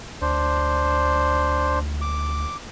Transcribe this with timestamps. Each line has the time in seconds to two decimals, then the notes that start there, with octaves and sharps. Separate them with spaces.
0.21 D2 D4 C5
2.01 D6